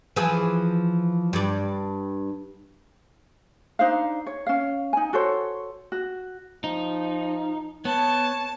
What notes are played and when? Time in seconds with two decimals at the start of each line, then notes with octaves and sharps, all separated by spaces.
0.16 E3 F3 G#4
1.33 G2 D5
3.79 D4 D#4 C5 F5
4.26 C#5
4.47 C#4 F5
4.93 D#4 G#5
5.13 F#4 A4 C5 C#5
5.92 F#4
6.64 F3 D#4
7.85 B3 C#5 A5